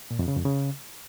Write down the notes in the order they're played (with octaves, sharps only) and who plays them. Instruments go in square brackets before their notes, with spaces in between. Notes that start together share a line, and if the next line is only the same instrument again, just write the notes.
[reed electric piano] A#2
F2
C#3
F2
C#3